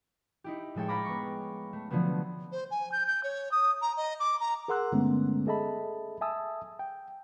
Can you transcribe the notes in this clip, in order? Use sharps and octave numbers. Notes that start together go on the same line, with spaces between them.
D#4 E4 G4
A2 F3 G#3 A4 C#5 G5
C#5 F5 A#5 B5 D6
B3 C#6
A3
D3 F3 F#3 A3 B3
C5
G#5
G6
G6
C#5
D#6
A#5
D#5
D6
A#5
G#4 A#4 F#5 C6 E6 F#6
G2 D3 G#3 A3 B3 C#4
G#4 A4 D#5 E5 A5 B5
E5 G#5 A5 D#6 E6
G5